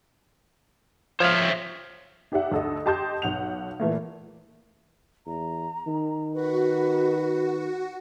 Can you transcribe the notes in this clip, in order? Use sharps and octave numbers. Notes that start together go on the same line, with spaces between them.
F3 C5 C#5 E5 F5
D#4 G4 D5 E5 F#5
D2 A4 D#5
G4 D#5 A5 C6 D#6 G6
B1 F#5 F7
A#2 E3 A3 A#3
E2 A#5
D#3
F#4 B4